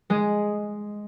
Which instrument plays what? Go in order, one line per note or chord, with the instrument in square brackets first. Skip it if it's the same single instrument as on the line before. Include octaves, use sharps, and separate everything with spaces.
[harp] G#3 G#4